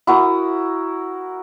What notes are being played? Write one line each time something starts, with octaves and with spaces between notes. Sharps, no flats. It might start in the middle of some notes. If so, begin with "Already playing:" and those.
E4 F#4 A#4 D#6